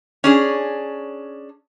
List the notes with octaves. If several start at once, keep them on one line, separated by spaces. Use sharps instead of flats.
C#4 D4 G#4